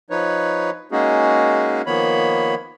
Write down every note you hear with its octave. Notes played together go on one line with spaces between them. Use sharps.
F3 D#4 B4 C#5
G#3 A#3 C#4 D#4 F#4 G#4
D#3 F3 A#3 B3 C#5 B5